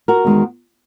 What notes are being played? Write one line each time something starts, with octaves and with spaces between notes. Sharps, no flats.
F#4 A#4
E2 D#3 G#3